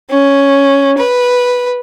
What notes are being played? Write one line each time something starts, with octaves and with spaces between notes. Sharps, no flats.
C#4
B4